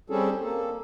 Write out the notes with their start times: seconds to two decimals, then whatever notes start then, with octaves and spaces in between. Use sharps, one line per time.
0.10 G3 C4 C#4 G#4 A4
0.41 A#3 A4